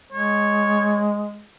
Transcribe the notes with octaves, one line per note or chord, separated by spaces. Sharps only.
G#3 C#5